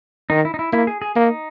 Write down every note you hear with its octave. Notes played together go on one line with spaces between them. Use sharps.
D#3 D#4
E4
D#4
E4
A#3 E4
G#4
G#4
A#3 D#4